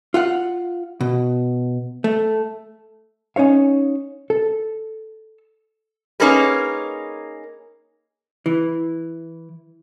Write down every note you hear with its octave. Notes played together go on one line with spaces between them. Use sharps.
F4 F5 F#5
B2
A3
C#4 D#4 C#5 F5
A4
A#3 C#4 D#4 G#4 A#4 B4
E3